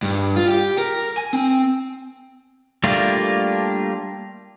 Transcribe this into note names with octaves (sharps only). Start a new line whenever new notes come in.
G2
F4
G4
A#4
G#5
C4
G3 A3 A#3 D4 F4